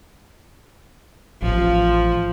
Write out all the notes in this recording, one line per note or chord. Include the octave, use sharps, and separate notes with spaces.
A1 F3